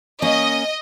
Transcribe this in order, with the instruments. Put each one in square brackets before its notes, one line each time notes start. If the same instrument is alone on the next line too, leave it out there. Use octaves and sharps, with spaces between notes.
[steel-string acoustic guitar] A#3 C#4 [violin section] D#5